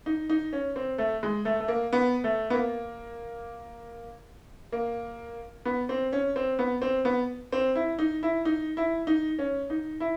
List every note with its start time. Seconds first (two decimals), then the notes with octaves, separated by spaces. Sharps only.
0.06 D#4
0.30 D#4
0.53 C#4
0.76 C4
0.98 A3
1.23 G#3
1.45 A3
1.60 A3
1.68 A#3
1.93 B3
2.24 A3
2.50 B3
2.54 A#3
4.72 A#3
5.65 B3
5.89 C4
6.12 C#4
6.36 C4
6.59 B3
6.82 C4
7.05 B3
7.52 C4
7.75 E4
7.99 D#4
8.23 E4
8.45 D#4
8.77 E4
9.07 D#4
9.39 C#4
9.70 D#4
10.00 E4